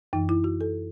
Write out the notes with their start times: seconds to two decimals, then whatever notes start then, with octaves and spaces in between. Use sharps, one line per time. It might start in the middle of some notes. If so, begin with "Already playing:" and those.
0.13 F#2 E3 D#4
0.29 E4
0.44 F#4
0.61 A4